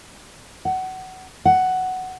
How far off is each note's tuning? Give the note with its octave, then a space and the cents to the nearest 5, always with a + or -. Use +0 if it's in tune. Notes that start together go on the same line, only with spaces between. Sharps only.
F#5 +20
F#5 +5